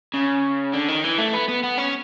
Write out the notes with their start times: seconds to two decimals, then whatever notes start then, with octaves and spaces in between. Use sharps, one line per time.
0.14 C#3
0.73 D3
0.88 D#3
1.04 E3
1.18 A3
1.33 B3
1.49 B3
1.63 B3
1.78 C#4